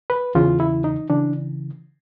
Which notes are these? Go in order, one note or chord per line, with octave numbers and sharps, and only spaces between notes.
B4
E2 C#3 E3 F4
E4
D#4
C#3 E3 D4